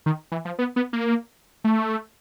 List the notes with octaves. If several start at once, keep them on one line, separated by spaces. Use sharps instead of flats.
D#3
E3
F3
B3
B3
A#3
A3